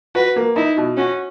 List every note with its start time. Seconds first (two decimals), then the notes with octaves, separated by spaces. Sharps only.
0.15 F#4 B4
0.36 A#3
0.56 D#4 E4
0.77 B2
0.97 C#4 F#4